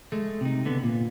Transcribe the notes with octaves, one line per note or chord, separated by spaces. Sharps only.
G#3 A3
C3 D#4
D3 B3
A#2